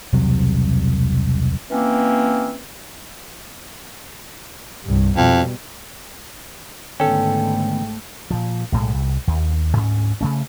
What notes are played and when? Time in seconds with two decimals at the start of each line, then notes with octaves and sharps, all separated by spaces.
0.13 E1 C2 C3 F#3
1.70 E3 A#3 C4 C#4
4.85 C2 G2
5.17 F2 B2 G3
7.00 G#2 D3 D#3 A3 B3 C#4 A4 G5
8.31 A#2 F3
8.72 B1 A2 G3 G#3
8.94 C2
9.27 D#2
9.76 D2 G#2 A#3 C#4
10.21 C#3 A3 C#4